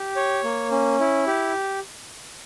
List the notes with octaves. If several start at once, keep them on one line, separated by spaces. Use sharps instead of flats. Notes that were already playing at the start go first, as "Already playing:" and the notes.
Already playing: G4
C#5
A#3
C#4
E4
G4